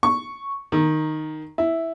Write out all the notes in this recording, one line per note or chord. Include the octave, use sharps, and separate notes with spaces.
C#6
D#3
E4